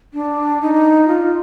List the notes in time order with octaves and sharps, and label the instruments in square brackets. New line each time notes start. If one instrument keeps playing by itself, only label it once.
[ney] D4
D#4
F4